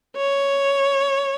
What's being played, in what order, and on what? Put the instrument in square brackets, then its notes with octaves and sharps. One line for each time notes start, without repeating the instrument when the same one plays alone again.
[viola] C#5